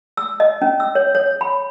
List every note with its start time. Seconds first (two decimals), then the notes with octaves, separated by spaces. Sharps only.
0.17 E6
0.40 D#5
0.62 C#4
0.80 E6
0.95 C#5
1.15 C#5
1.41 B5